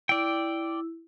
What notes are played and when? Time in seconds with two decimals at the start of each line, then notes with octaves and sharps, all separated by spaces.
0.09 E4 D5 G5